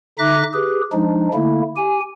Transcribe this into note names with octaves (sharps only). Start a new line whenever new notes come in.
D3 D#4 E5 D6 F#6 A#6
G4 G#4 B4
F3 G#3 D4 D#4
D3 A3 A#3 E4
G4 G#5